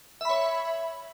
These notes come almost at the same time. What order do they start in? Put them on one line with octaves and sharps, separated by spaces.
E5 B5 C#5